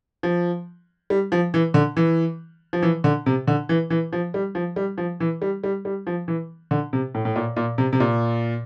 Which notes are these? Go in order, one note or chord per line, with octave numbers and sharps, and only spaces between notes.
F3
G3
F3
E3
D3
E3
F3
E3
D3
C3
D3
E3
E3
F3
G3
F3
G3
F3
E3
G3
G3
G3
F3
E3
D3
C3
A2
A2
A#2
A#2
C3
C3
A#2